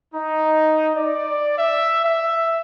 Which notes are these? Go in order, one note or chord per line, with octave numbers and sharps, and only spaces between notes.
D#4
D5
E5
E5